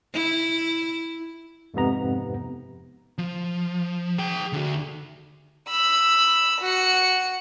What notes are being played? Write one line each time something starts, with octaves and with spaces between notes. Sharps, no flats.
E4
F2 G#2 C3 B3 A#5
F3
G#4 G5
D3 F#4
B5 E6
F#4 C#7